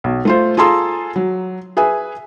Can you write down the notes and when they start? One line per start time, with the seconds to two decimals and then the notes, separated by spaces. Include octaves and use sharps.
0.04 B1
0.25 A3 F4 C5
0.57 F4 G#4 A4 A#5 C6 E6
1.16 F#3
1.77 G#4 B4 E5 G#5